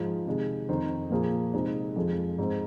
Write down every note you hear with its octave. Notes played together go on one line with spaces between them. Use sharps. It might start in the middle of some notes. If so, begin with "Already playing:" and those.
Already playing: G#2 F3 G#3 F4 G#4
C3 D#3 G#3
F2 D#3 C4 D#4 C5
A#2 F3 A#3 G#4
C3 G#3 C4 D#4 G#4
F2 F3 G#3
G#2 G#3 C4